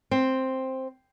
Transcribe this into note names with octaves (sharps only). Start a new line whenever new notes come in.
C4